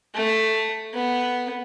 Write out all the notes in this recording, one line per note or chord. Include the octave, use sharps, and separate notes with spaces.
A3
B3